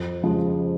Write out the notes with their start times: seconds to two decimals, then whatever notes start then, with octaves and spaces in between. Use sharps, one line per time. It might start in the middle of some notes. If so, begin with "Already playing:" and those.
Already playing: F2
0.23 C#3 F3 G#3